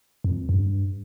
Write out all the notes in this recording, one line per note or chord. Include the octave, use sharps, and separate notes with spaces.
F2
F2
G2